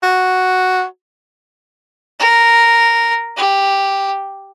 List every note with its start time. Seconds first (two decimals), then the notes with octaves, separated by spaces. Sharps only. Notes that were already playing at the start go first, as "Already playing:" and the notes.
0.03 F#4
2.20 A#4
3.37 G4